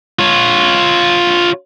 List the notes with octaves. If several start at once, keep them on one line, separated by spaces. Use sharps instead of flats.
F4 C#5